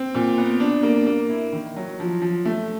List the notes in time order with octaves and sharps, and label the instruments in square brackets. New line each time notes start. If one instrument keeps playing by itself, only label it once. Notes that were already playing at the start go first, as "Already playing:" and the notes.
Already playing: [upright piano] C4
A#2
B3
D4
A#3
A#3
E4
D#3
F#3
F3
F3
A3